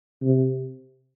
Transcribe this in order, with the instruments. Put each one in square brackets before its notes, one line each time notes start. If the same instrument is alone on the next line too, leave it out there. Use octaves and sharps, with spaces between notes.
[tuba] C3